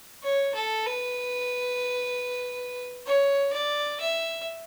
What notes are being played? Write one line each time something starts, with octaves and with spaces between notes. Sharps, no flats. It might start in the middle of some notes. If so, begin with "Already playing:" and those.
C#5
A4
B4
C#5
D5
E5